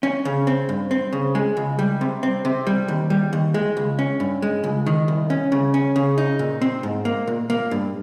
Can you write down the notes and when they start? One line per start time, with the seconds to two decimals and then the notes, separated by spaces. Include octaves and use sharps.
0.03 C#4
0.25 C#3
0.47 C4
0.69 G2
0.91 C4
1.13 C#3
1.35 G#3
1.57 C#2
1.79 G3
2.01 C3
2.23 C4
2.45 C3
2.67 G3
2.88 D#2
3.10 G3
3.33 D#2
3.54 G#3
3.77 C#2
3.99 C#4
4.20 G2
4.42 G#3
4.64 C#2
4.86 D#3
5.08 C2
5.30 C#4
5.52 C#3
5.74 C#4
5.96 C#3
6.18 D#4
6.39 A#2
6.61 C4
6.83 G#2
7.05 A#3
7.27 A#2
7.50 A#3
7.71 G2